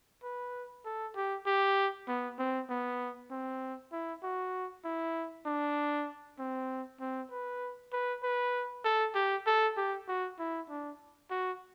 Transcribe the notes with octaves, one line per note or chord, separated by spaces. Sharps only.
B4
A4
G4
G4
B3
C4
B3
C4
E4
F#4
E4
D4
C4
C4
B4
B4
B4
A4
G4
A4
G4
F#4
E4
D4
F#4